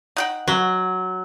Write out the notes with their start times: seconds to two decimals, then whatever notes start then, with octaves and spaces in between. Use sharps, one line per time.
0.17 D#4 F#5 G5
0.48 F#3